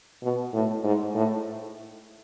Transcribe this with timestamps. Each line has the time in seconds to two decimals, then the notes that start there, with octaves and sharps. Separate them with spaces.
0.23 B2
0.53 A2
0.84 G#2
1.15 A2